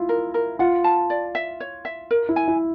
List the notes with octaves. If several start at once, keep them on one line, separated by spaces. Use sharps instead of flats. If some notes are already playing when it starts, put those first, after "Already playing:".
Already playing: E4 F4
A#4
A#4
F4 F#5
A5
D5
E5
C#5
E5
A#4
E4
G#5
E4